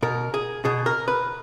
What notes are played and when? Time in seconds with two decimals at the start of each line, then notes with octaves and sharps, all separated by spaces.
0.03 B2 A#4
0.34 G#4
0.65 B2 G#4
0.86 A#4
1.08 B4